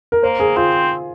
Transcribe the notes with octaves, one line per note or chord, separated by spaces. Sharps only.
A#4
A#3 C5
G#4
C4 F4